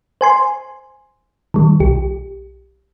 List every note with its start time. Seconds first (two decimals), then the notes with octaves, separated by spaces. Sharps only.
0.21 C5 G#5 C6
1.54 D#3 G3
1.80 B1 G4